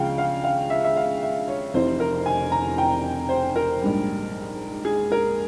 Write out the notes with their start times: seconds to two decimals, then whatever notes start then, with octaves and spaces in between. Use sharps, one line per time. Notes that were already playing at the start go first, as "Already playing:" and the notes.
Already playing: C#2 C#3 F3 F5 G5
0.18 F5
0.44 F5
0.70 E5
0.84 E5
0.96 F5
1.23 E5
1.48 C#5
1.74 F1 F2 C3 E3 C5
2.00 A#4
2.26 G#5
2.52 A#5
2.78 G5
3.29 C5
3.56 A#4
3.81 A#1 G#2 G3
4.85 G#4
5.12 A#4